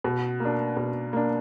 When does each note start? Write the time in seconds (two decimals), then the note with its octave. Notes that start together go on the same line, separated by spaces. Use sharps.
0.04 B2
0.40 A#3 D4
0.77 B2
1.13 A#3 D4